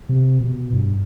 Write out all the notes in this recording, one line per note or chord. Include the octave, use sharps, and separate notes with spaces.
C3
B2
G2